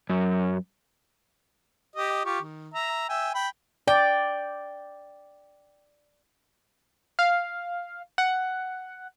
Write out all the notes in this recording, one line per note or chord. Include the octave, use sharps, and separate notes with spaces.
F#2
G4 D#5
F4 G4 C#6
D#3
E5 A#5
E5 G5 G#5
G5 B5
D5 G5
F5
F#5